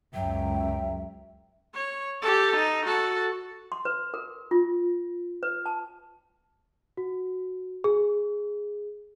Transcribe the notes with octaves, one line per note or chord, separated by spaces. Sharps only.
C#2 F#2 F#3 E5 G5
C#5
G4 A4
D#4
F#4 A4
C6
B4
A#4
F4
B4
A5
F#4
G#4